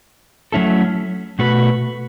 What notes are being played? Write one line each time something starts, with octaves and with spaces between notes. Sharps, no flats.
F#3 A3 C#4 E4 A4
B2 A3 F#4 B4